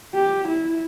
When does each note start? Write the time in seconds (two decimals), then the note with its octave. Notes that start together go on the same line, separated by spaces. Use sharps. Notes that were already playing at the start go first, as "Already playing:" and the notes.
0.15 G4
0.48 E4